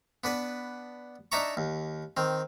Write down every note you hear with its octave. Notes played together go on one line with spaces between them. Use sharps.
B3 D4 B4
D4 D#4 E5 A5 A#5 C#6
D#2
D#3 C4